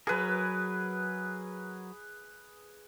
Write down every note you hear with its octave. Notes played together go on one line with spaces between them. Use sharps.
F#3 G#4 A#4 B4